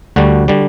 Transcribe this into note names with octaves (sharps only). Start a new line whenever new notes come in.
D2 D3 G3 F#4
D3 G3